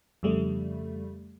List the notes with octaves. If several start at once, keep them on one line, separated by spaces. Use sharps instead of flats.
F2 C#3 G3 A3